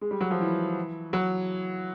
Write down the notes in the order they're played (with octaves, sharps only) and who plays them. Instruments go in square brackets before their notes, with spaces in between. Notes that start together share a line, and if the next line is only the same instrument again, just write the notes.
[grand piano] G#3
G3
F#3
F3
E3
F#3